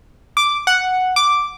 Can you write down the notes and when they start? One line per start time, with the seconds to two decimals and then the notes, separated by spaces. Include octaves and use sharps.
0.37 D6
0.67 F#5
1.16 D6